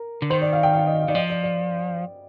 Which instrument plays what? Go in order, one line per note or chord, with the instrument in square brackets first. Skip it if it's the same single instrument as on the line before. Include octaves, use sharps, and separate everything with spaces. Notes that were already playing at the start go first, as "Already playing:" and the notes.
Already playing: [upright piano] A#4
[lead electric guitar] D3
[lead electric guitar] D#3 [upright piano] C5
[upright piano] D5
F5
G5
F5
D#5
F5
[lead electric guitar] D#3 [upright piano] D5
[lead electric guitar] F3 [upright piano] D#5
[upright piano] D5
D5